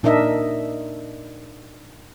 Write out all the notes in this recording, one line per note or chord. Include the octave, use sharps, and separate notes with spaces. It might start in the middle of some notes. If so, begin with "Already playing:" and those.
A#2 D4 D#4 A#4 D#5 E5